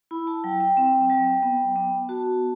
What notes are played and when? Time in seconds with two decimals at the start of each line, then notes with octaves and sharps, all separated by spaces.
0.11 E4 B5
0.27 A5
0.44 F#3 G5
0.60 G5
0.77 C4
1.10 F#3
1.43 B3
1.76 B3
2.09 F#4 A5